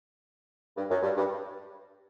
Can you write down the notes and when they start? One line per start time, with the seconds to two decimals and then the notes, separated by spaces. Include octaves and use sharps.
0.77 G2
0.90 F#2
1.03 G2
1.17 G2